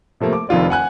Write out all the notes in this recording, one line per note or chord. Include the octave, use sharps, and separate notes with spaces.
C3 F3 A3 A#3
D6
F1 F2 D#3 F4 D5
F#5 G#5 F#6